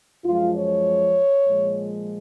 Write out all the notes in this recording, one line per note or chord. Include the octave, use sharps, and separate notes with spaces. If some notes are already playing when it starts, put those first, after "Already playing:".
F#2 F3 G#3 F4
C#5
A#2 F3 G#3